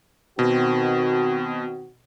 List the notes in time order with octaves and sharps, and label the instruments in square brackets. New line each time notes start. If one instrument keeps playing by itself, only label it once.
[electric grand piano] B2 [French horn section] D#3 C4 F#4